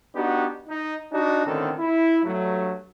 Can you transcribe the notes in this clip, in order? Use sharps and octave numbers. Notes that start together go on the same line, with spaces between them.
B3 D4 D#4 F#4 G4
D#4
D4 D#4 F#4
A2 D3 D#3 C4 C#4 A4
E4
G2 F#3 A3